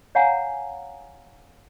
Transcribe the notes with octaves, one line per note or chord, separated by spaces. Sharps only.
C#5 F5 F#5 G#5 A#5